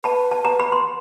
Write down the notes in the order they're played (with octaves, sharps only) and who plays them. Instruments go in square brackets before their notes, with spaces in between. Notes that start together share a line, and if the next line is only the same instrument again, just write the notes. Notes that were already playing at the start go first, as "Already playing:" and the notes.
[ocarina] B4 [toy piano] A5 B5
[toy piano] A5
A#5
B5
C6